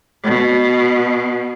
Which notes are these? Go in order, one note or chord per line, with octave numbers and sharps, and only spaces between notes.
B2